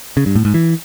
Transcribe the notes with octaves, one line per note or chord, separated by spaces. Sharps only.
C#3
G2
A2
G#2
E3